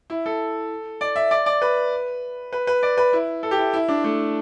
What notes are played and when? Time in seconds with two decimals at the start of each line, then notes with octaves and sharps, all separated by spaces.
0.10 E4
0.26 A4
1.01 D5
1.16 E5
1.31 D5
1.46 D5
1.62 B4
2.53 B4
2.67 B4
2.83 D5
2.97 B4
3.13 E4
3.43 A4
3.51 G4
3.58 E4
3.73 E4
3.88 D4
4.04 A3